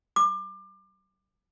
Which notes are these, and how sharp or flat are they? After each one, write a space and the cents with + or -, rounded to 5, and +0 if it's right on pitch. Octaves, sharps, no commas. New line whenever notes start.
D6 +30